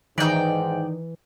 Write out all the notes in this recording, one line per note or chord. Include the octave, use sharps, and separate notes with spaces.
G#2 D#3 E3 D#4 D5 G5